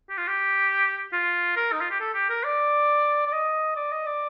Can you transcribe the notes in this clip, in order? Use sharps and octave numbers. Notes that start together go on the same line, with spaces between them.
G4
F4
G4
F4
A#4
D#4
F4
G4
A4
G4
A#4
D5
D5
D#5
D5
D#5
D5